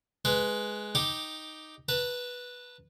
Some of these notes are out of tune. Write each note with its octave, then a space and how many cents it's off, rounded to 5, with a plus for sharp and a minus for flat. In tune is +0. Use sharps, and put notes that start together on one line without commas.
G#3 +10 B4 +5
D#4 +0 G4 +0 D6 +0
B4 -10 A5 +35